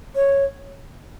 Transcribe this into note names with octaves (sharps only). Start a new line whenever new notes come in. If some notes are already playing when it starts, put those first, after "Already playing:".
C#5